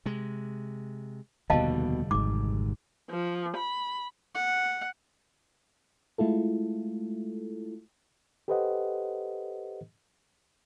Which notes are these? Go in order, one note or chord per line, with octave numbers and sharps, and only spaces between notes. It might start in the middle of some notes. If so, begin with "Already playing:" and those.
C3 G#3
F1 D#2 B2 D3 G3 D#5 F5 A5
G#1 G#2 D6
F3
B5
F#5
G#3 A3 E4 F4 A4
G4 A4 B4 C5 D#5 F#5